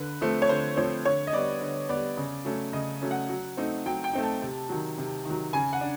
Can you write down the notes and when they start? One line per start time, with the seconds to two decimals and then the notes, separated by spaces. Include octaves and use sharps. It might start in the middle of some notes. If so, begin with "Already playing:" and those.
Already playing: D3 B4
0.21 F3 A3 C4
0.42 C#5
0.49 D3 C5
0.77 F3 A3 C4 C#5
1.05 D3 C#5
1.27 D#5
1.33 G3 B3 D5
1.61 D3
1.89 G3 B3 D5
2.17 C#3
2.45 F#3 A3 C#4
2.73 C#3 D#5
3.02 F#3 A3 C#4
3.11 F#5
3.29 F#3
3.57 A3 C4 D#4
3.85 F#3 G5
4.04 G5
4.13 A3 C4 D#4
4.23 A5
4.42 C3
4.69 D#3 F#3
4.98 C3
5.25 D#3 F#3
5.53 C#3 G#5
5.73 F#5
5.81 D4